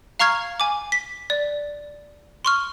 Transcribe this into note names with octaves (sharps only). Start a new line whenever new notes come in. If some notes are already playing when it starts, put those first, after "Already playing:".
F5 A#5 C#6 F6 G#6
G#5 D6
B6
D5
C6 C#6 F6